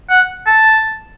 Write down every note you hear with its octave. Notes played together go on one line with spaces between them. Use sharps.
F#5
A5